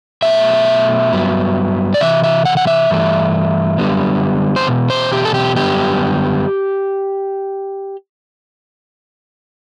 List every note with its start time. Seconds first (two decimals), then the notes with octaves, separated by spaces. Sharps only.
0.22 B2 F#3 A3 E5
1.12 G2 F#3 B3
1.94 D5
2.00 C3 E3 E5
2.23 E5
2.45 F#5
2.57 F#5
2.67 E5
2.90 G2 E3 A3
3.78 F#2 D3 G3 B3
4.56 C5
4.67 E2 B2
4.90 C5
5.12 G4
5.25 A4
5.34 G4
5.56 F#2 D3 G3 B3 G4